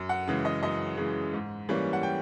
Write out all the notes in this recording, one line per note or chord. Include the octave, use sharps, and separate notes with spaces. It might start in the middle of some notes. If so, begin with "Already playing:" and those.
Already playing: F#2
F#5
C#3 E3 G#3
D#5
F#2 D#5
C#3 E3 G#3
G#2
E3 G3 A#3 C#4
F#5
G5